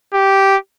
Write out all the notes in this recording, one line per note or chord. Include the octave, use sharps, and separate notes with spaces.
G4